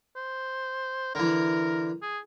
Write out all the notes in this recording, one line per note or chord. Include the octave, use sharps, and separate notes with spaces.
C5
D3 E3 A#4
G#4